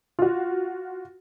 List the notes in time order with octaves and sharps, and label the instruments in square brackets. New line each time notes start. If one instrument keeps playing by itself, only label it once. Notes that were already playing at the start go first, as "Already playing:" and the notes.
[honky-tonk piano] F4 F#4